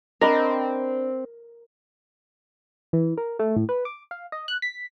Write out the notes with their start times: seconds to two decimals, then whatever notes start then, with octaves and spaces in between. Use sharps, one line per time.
0.21 C4 D4 A#4 D#5 B5
2.93 E3
3.18 A#4
3.39 A3
3.56 A2
3.69 B4
3.85 D6
4.11 F5
4.32 D#5
4.48 F#6
4.62 B6